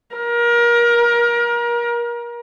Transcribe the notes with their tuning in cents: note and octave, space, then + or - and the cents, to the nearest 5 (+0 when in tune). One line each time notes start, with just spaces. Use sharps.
A#4 +30